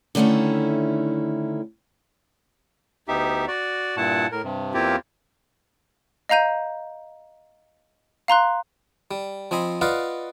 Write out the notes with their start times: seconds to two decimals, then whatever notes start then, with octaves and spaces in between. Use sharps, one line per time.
0.15 D3 D#3 A3 C#4 E4
3.08 D2 B3 D#4 G4 E5
3.48 F#4 D5
3.97 G2 A#2 E4 F#5 A5
4.32 A2 A#4
4.44 G2 C3
4.74 E2 A#3 C4 E4 F4 G4
6.29 D#5 F5 A#5 G6 D#7
8.28 F5 A#5 C6 F#6
9.11 G3
9.51 F3 C4 D#5 G#5 B5
9.81 F4 B4 D5 D#5 F5 F#5